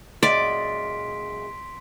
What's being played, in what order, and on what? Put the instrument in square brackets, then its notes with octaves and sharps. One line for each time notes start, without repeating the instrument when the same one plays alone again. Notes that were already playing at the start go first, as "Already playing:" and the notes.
[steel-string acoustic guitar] F#2 A#2 G#3 [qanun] D5 [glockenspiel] C6 B6 D7